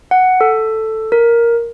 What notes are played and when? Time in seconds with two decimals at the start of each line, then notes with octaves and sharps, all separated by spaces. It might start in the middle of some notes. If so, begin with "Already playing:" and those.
0.11 F#5
0.41 A4
1.12 A#4